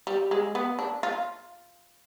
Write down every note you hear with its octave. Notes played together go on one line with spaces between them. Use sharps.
G3
G#3
B3
D4
F4